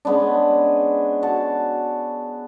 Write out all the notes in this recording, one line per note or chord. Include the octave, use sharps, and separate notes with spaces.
G#3 B3 C#4 D4
F#4 A5